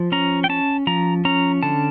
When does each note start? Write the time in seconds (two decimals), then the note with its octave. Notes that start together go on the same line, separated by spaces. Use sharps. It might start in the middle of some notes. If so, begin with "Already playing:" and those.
Already playing: F3
0.12 C#4 A#5
0.44 G5
0.49 C#4 A5
0.87 F3 A#5
1.25 C#4 A#5
1.63 D3 A5